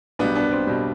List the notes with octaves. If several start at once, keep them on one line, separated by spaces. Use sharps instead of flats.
B1 B2 G3 B3 D4
B3 D4
C4
B2 G3